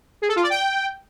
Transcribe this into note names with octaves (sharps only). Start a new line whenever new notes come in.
G#4
A4
F4
D5
G5